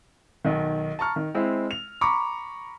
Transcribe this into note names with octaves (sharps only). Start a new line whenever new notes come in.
B1 D#3
A5 A#5 C#6 F6
D#3
G#3 C4 E4
F7
A#5 B5 C#6 D6